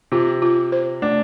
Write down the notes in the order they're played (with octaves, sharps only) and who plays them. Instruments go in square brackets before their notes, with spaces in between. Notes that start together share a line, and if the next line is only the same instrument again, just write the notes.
[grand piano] C3 [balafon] F4
[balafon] F4
C5
[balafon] A3 [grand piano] D4